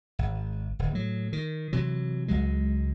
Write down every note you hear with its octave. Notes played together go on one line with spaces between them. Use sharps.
G#1
D1
A2 F#3
D#3
C3 E3 F#3
C#2 F#3 G#3